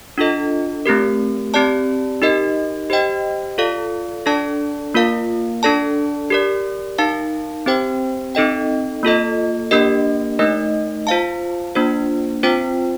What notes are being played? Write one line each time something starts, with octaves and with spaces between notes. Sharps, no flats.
D4 F4 A4 D#5
A3 C4 G4 A#4
C4 G4 D5 A5
D#4 G4 A#4 D#5
G4 C5 D#5 G5
F4 A4 D5 F5
D4 A4 D5 A5
A#3 F4 A#4 F5
D4 A4 D5 A5
G4 A#4 D5
D#4 A#4 F5 A5
C4 G4 C5 G5
C4 D#4 A4 D#5 G5
A#3 F4 A4 D#5
A#3 D4 G4 A#4 D#5
A3 D#4 A#4 D#5
F4 C5 F5 A5
A#3 D4 F4 C5
C4 F4 C5 G5